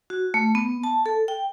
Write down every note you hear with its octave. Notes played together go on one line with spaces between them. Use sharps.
F#4
A3
B3
A5
A4
G5